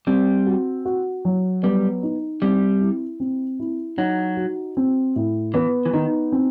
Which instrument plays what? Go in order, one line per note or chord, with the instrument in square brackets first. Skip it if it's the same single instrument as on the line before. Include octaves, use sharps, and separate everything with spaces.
[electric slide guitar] G3 [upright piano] C4
[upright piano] F#4
F#4
F#3
[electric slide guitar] G3 [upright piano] B3
[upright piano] D#4
[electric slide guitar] G3 [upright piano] C4
[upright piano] E4
C4
E4
[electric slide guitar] F#3 [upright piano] D#4
[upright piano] F#4
C4
A2
[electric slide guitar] E3 [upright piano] B3
[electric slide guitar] E3
[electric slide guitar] D#3 [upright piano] D#4
[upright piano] C4